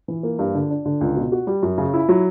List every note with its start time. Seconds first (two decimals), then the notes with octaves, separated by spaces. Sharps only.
0.08 E3
0.23 A#3
0.39 G2
0.55 D3
0.70 D4
0.85 D3
1.01 C#2
1.16 B2
1.32 F#4
1.47 G3
1.63 F#2
1.78 C#3
1.93 E4
2.09 F#3